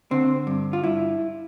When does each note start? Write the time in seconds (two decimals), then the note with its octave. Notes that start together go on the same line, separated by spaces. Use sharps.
0.11 D3 C4
0.47 G2
0.73 F4
0.84 G2 E4